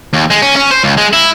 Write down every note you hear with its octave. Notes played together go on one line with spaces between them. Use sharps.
D#2
G#3
C#4
C#4
C5
C#2
G#3
E4